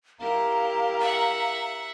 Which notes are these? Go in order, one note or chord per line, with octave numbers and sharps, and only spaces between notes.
E4 G4 A#4 F5 A#5
E5 F#5